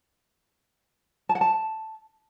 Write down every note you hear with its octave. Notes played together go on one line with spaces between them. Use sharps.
A5
F#5
A5